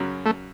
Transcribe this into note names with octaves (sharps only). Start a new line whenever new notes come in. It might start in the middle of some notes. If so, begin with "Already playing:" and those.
Already playing: F#2 C#3 F#3
A3